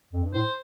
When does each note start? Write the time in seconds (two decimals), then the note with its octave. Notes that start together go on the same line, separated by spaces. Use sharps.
0.13 F2
0.23 G2
0.34 A2 C5